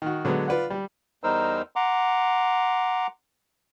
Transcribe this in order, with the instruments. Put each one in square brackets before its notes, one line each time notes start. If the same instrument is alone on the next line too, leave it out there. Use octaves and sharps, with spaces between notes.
[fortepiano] D#3 F#4
D3 F#3 G#3 B3
F4 B4 D5 F#5
G3
[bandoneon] E2 G3 D#4 A#4 C5 E6
F#5 A#5 C6 D6